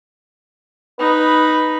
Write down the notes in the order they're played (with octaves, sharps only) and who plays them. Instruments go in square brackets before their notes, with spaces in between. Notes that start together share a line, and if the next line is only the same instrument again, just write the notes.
[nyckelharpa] D#4 B5 [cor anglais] B4